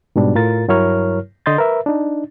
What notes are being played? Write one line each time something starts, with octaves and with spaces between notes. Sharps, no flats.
G#2 B2 G3 D4
A2 F4 A#4 A6
G2 F#3 E4 A#4 C#5 F6
D3 D#5 C6 G6 A6
A#4 B4 E5
D4 D#4